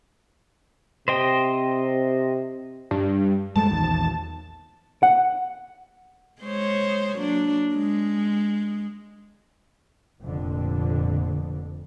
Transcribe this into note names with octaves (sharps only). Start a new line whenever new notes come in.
C3 C5 D#5 G5
G2
G2 G#3 A3 A5
A#1 E2 D#3
F#5
G#3 C5 C#5
F#3 A#3 D4
G#3
F1 F2 A#2 D3